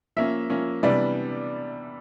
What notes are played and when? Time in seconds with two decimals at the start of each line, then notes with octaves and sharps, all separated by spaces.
0.16 F3 A#3 C#4 E5
0.50 F3 A#3 C#4
0.83 C3 E3 G3 B3 D4 D5